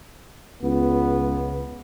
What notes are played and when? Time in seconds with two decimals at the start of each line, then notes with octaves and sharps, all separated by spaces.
0.63 C#2 B3